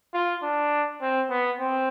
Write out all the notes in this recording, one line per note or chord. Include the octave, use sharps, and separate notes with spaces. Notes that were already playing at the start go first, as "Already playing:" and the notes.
F4
D4
C4
B3
C4